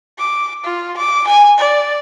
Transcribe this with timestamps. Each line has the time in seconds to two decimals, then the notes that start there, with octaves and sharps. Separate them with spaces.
0.18 D6
0.64 F4
0.97 D6
1.27 G#5
1.59 D5